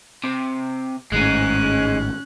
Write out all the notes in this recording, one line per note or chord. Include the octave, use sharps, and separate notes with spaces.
C3
G#1 A2 G#3 C#4 D#4 F#6